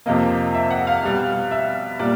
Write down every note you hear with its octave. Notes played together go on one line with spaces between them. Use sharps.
F2 C3 F3 A#3 D#5
E5
F#5
F5
B2 G3 B3
E5
A#2 G3 D5